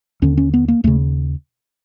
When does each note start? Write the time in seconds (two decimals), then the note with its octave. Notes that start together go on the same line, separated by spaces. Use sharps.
0.22 D#2 D3 C#4
0.37 C#4
0.54 B3
0.68 A#3
0.84 D#2 C#3 A3